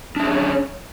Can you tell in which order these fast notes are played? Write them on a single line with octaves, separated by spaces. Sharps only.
D4 E5 G#4 C#4 C#5